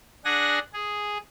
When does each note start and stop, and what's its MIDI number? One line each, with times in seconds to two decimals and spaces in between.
0.25 0.59 62
0.25 0.59 68
0.25 0.59 78
0.25 0.59 80
0.25 0.59 94
0.73 1.18 68